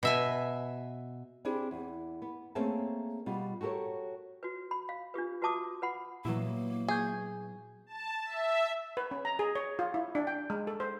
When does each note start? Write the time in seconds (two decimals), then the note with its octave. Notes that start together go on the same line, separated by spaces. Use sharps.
0.03 B2 E5 G#5
1.45 C4 D4 E4 G4 G#4 D5
1.71 E2
2.22 B3
2.55 A3 A#3 C4 C#4 G#4 A5
3.26 B2 G3 F4
3.61 F#4 G4 A4 A#4 C#5
4.43 F#4 B4
4.71 B5
4.89 F5
5.14 D4 F4 G4 B4
5.42 F#4 B4 E5 A5 D6 D#6
5.82 B4 F#5 B5
6.25 A#2 F#3 A#3 B3 E4
6.88 G#4 C#6 G6
7.86 A5
8.26 E5
8.97 B4
9.11 C#4
9.25 A#5
9.39 G#4
9.55 C#5
9.79 F4
9.94 E4
10.15 D4
10.27 G5
10.50 G#3
10.67 A4
10.80 C5